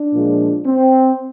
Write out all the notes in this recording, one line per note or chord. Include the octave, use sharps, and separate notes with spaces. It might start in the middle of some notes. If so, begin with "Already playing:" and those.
Already playing: D4
A#2 F3 G#3
C4